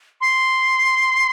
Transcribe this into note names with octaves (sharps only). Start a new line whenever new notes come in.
C6